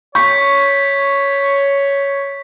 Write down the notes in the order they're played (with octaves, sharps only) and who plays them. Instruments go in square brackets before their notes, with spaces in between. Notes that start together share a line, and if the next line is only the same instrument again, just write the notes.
[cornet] C#5 [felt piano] C#6 [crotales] G6 B6